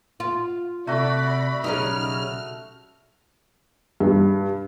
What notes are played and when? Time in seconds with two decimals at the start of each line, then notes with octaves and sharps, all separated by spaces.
0.20 F4
0.87 C3 A3 F#4 D5 B5
1.64 B1 C#3 G3 C#4 D#4 F6
4.00 G2